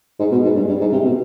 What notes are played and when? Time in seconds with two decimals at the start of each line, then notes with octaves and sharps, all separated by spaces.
0.19 G#2
0.31 B2
0.44 G#2
0.55 G2
0.68 G2
0.80 G#2
0.92 C3
1.05 B2